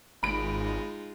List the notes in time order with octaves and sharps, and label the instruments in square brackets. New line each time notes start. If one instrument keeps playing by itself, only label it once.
[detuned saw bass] G#1 [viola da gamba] G#3 D#4 F4 [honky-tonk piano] B5 D7